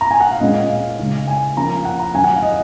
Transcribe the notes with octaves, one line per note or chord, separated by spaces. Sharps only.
A#5
G#5
F#5
F5
A#2 G#3 C#4 D#5
F5
C#3 G#3 D#4
G#5
F3 A#3 C#4 A#5
F5
F#5
A#5
D#3 F#3 C#4 G#5
F#5
F5
D#5